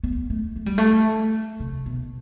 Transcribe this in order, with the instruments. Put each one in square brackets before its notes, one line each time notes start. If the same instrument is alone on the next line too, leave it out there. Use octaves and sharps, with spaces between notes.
[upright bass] B3
A3
A3
G3
A3
C3
B2